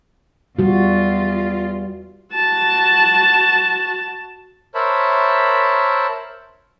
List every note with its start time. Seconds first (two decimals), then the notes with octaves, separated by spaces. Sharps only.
0.59 E2 G3 F4 F#4
2.35 F#4 A5
4.75 A#4 C5 C#5 E5 A5 B5